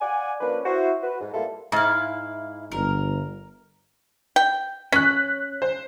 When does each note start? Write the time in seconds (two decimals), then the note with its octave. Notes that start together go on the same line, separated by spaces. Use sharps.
0.01 D5 F5 F#5 G#5
0.40 F3 A#3 C#4 D4 B4
0.65 E4 F#4 C5
1.03 F#4 B4
1.21 G#2
1.34 G3 A#3 B3 E4 F4 A4
1.72 G#2 E4 F5
2.72 G1 A#4
4.36 G5
4.92 C#4 F#6 B6
5.62 C5